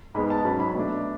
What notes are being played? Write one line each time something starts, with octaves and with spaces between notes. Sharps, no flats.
G#2 G#3 B3 B5
A5
G#2 F#3 C#4 B5
B5
B2 A3 D4